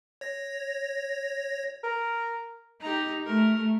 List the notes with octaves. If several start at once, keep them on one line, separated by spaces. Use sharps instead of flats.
C#5 A#6
A#4
D#4 G4 A#5
A3 A#4